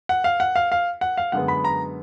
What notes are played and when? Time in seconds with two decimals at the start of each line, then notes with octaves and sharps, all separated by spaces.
0.09 F#5
0.24 F5
0.40 F#5
0.56 F5
0.72 F5
1.01 F#5
1.17 F5
1.32 F#2 D3 G#3 B3 F#5
1.48 B5
1.64 A#5